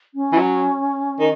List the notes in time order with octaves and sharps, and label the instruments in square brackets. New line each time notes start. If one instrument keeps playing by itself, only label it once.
[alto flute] C#4
[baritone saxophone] E3
F#3
D#3